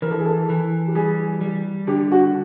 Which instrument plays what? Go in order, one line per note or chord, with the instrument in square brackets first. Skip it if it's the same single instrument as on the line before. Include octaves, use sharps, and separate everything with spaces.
[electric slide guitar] E3 [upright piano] A#4
[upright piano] A4
G#4
A4
[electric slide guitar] E3
[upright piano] G4
[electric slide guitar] G3 [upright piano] G#4
[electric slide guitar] G3
[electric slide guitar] D3 [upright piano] G4
[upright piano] F#4